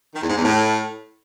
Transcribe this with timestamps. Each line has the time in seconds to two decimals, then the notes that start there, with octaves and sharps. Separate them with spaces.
0.14 D#3
0.22 E2
0.29 G#2
0.37 E2
0.44 A2